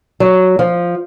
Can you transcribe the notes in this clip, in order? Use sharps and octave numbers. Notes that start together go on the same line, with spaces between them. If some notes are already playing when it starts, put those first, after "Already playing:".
F#3
F3